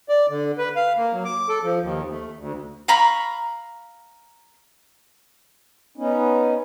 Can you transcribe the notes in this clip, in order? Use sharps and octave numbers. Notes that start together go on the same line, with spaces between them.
D5
D3
B4
F5
A#3
F#3
D6
A4
F3
D#2
A3
D2
F5 A#5 B5 C#6
B3 C#4 D#4